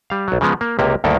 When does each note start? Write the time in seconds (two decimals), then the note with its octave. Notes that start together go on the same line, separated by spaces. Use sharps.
0.10 G3 F5
0.28 B1 F#3
0.41 C#3 F3 G#3 B3
0.61 A#3
0.79 C#2 C3 A#3 G4
1.04 D2 G2 D#3 A#3 A4 G5